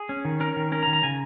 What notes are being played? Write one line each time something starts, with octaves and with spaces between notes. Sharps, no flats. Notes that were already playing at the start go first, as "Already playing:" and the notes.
Already playing: G#4
C#4
D#3
C#4 A#4
D#3
C#4 A#4
A#5
D#3
A#5
C#3 G#5